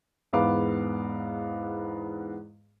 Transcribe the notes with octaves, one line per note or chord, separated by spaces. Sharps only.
E2 G#2 B3 F5 D6